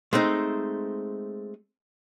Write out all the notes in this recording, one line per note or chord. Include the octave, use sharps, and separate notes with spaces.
G#3 A3 C4 D#4